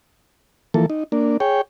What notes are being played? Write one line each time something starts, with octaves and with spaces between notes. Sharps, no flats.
E3 F3 A#3 A4
D#4
A#3 D4
G#4 C#5 G5